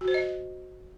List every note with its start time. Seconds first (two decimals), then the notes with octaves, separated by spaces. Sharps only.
0.01 F#4
0.08 C5
0.14 D#5